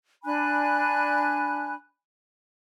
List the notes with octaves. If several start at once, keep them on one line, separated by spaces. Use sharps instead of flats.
D4 G#5 B5 F#6